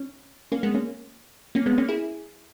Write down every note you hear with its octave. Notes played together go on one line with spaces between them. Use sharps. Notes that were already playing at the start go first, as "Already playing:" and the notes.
Already playing: C#4
A#3 C#4
G#3 B3
A#3 C#4
A#3 C#4
G#3 B3
A#3 C#4
E4 G#4